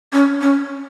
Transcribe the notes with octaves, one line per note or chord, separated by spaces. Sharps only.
C#4
C#4